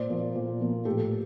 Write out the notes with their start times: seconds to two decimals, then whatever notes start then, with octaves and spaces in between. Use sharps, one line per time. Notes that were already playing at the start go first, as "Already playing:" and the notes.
Already playing: A#2 C5 D5
0.09 F3 A#3
0.35 A#2
0.61 F3 A#3
0.85 A2 G4 A4